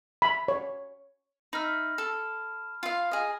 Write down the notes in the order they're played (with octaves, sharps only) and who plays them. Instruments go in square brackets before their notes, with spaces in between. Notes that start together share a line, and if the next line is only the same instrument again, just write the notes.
[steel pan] B5
C#5
[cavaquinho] D#4 E5 [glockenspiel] B5 F6
[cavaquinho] A4
F4 F5
G#4 D#5